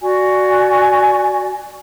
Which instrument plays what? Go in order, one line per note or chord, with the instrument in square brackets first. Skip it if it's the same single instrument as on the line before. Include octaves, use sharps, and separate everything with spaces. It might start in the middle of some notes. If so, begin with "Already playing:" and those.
[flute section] F#4 D5 G#5